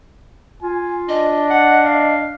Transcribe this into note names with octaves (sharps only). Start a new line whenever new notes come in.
F4 G#5
D4 D#5
F#5
F5